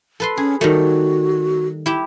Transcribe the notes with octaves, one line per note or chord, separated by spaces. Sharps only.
A4 B4 C6
C#4 G#4
D#3 G3 A3 F#4
E4 G4 E5